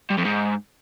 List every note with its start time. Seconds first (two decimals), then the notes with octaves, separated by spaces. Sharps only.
0.11 G2
0.18 F2
0.25 G#2